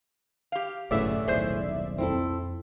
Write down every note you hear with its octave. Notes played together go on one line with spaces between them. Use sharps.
G4 F5
F#1 D2 A2 C#3 E3 B3 D5 E5
D#1 B1 G#4 C5
F2 C4 E4 A4